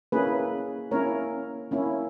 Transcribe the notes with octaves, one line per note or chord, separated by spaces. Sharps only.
A#3 C#4 E4 G#4 B4
A#3 C#4 E4 A#4 C#5
A#3 C#4 E4